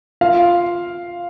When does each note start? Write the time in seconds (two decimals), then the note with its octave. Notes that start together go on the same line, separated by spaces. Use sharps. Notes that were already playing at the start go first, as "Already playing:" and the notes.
0.21 F4 F5